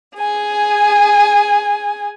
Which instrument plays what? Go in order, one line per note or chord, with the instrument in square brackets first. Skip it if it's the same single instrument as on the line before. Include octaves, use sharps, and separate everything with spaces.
[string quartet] G#4 G#5